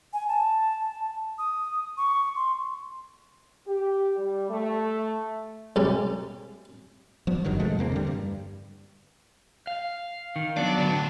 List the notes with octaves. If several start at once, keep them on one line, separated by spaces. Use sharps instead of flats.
G#5
A5
D#6
C#6
C6
G4
G3
A3
B1 G#2 C3 C#4 D5
F3 G3 B3
F#1 G2 D#3 F#3
C3 F3 G#3 A3
E2 A#3 C4
D3 G3
G2
F5
D#3
F#3 B3 D4 D5
A2 D3